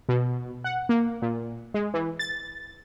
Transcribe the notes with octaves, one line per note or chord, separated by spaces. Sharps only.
B2
F#5
A#3
A#2
G#3
E3
A6